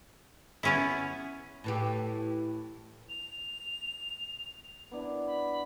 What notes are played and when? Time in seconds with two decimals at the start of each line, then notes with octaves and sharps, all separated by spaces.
0.63 B3 C#4 E4
1.64 A2 E3 G4
3.09 F7
4.91 B3 D4 E4
5.26 B5